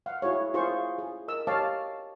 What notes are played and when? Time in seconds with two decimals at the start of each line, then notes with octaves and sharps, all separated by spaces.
0.06 F5 F#5
0.22 E4 F#4 G#4 C#5
0.54 E4 F4 G#4 C5 F5 C#6
0.98 G#4
1.28 A#4 D#5 E6
1.47 G4 C#5 D#5 F5 A5 D6